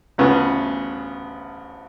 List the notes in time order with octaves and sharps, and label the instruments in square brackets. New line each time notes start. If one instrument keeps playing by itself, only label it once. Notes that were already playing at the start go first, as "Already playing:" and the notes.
[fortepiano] A1 D2 C#3 B3